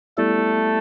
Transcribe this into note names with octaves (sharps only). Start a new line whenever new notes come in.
G3 A3 B3 E4 G4 A4 D5